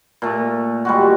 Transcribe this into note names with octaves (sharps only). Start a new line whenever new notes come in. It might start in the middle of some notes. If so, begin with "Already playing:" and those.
A#2 A3
G3 G#3 F#4